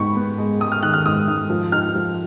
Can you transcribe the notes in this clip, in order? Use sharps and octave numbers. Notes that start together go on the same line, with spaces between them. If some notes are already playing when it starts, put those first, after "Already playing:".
Already playing: G#2 B3 B5 C#6
B3
G#3
G#3 D#6
F6
D#3 F#6
F6
G#2 D#6
G#2 F6
F3
D#4 F6
F3